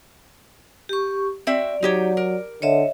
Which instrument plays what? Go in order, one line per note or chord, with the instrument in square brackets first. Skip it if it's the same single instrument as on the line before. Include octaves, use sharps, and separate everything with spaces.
[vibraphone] G4 C#6
[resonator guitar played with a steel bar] C4 F#4 E5 [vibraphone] D5
[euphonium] F#3 [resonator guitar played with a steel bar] D#4 G4 C#5
[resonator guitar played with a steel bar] A#4
[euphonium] D3 [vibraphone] C#5 D#5 E5